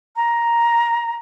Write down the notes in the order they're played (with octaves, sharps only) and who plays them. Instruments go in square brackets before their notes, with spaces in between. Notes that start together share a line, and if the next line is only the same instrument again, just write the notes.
[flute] A#5